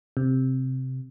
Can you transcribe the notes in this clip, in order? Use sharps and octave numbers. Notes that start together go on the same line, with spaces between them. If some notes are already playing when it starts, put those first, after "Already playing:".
C3